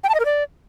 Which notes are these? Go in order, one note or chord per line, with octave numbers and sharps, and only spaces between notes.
G5
A5
D#5
A#4
D5